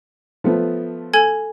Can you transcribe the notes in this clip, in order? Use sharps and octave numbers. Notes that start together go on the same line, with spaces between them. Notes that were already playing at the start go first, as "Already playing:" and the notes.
F3 A3 B3
A4 G#5 G#6